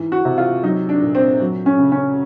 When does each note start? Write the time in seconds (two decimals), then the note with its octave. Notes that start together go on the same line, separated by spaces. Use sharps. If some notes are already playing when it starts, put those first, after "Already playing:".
Already playing: G#2 E3
0.12 F#4
0.25 C3
0.38 F4
0.63 F#3 D#4
0.89 D4
1.02 A#2
1.15 C4
1.40 F#3
1.66 C#4
1.79 C#3
1.92 C#4